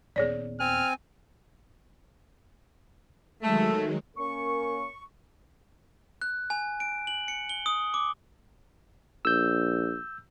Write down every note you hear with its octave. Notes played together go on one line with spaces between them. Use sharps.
D#1 B3 G#4 C#5 D5
C4 G#5 F6
D#3 F#3 G#3 A3
A#3 C#4 A#4 C#6
F#6
G#5
D7
F#7
C#7
G7
D#6
D6
A#1 E6 G6